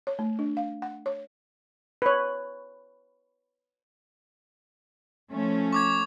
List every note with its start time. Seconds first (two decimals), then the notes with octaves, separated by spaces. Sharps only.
0.07 C#5
0.19 A3
0.39 D4
0.57 F5
0.82 F#5
1.06 C#5
2.02 B4 C#5
5.32 F3 A3 C#4
5.73 C#6 D6 G#6